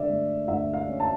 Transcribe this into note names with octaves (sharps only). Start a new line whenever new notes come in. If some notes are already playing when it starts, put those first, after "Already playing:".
Already playing: D3 D5 E5
A3
D2 E5
F5
C#4
A5